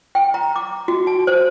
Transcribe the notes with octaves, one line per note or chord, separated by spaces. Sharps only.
G5
A#5
D6
F#4
A5
C5